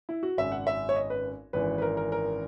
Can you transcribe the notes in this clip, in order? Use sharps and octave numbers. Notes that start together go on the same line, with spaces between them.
E4
F#4
G#1 F#2 C#3 E5
F#5
E5
C#5
D#5
B4
G#1 F#2 E3 B4
B4
A#4
A#4
A#4